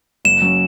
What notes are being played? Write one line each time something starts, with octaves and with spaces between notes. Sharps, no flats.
F#1 E7
F#3 C#4